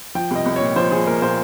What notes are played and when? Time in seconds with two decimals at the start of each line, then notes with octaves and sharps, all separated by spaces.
0.15 F3 G5
0.31 C2 D#5
0.46 C2
0.56 A#2 C#5
0.76 F3 C5
0.92 F3 G#4
1.07 A#2 A#4
1.22 A#2 C5